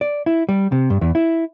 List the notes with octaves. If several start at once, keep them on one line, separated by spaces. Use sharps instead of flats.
D5
E4
G3
C3
G2
E2
E4